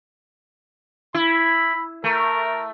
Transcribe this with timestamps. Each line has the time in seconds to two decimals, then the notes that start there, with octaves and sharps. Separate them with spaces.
1.14 E4 B5
2.04 A3 A#4